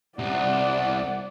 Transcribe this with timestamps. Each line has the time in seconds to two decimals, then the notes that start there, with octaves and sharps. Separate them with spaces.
0.19 C2 D5 F#5